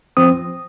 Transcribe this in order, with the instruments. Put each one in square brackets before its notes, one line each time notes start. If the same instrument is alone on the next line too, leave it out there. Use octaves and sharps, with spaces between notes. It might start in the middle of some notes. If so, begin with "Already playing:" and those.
[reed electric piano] F3 C4 D#6